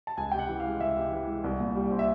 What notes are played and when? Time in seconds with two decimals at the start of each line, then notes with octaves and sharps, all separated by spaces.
0.07 A5
0.17 C#2 G#5
0.32 C3 G5
0.39 F#5
0.49 E3
0.60 G#3 F5
0.81 C#2 E5
0.97 C3
1.12 E3
1.27 G#3
1.44 C2
1.60 A#2
1.75 G3
1.91 C4
1.99 E5